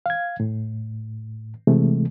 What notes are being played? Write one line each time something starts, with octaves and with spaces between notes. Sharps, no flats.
F5 G#6
A2
C3 E3 G#3 A3